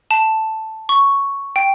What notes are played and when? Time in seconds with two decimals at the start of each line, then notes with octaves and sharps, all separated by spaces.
0.11 A5
0.89 C#6
1.56 G5